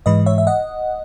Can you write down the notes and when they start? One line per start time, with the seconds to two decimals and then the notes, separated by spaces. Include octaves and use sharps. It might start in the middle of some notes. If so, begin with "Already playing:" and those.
0.06 G#2 E3 G#3 B4 D#5
0.26 C#5 E5
0.38 E5
0.47 D#5 F#5